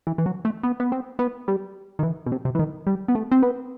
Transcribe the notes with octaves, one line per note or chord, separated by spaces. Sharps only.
E3
E3
F#3
A3
B3
B3
C4
B3
G3
D#3
E3
B2
C3
C3
E3
D#3
G3
B3
A3
C4
B3